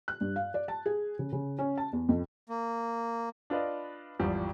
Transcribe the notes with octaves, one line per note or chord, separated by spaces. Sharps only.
F#6
G2
F5
D5
A5
G#4
C#3
C#3
C#4
A5
E2
F2
A#3
D4 F4 B4 D5 D#5
G#1 E2 F3 G3